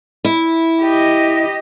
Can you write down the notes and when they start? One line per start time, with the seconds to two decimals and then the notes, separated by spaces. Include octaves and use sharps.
0.25 E4
0.82 G4 D#5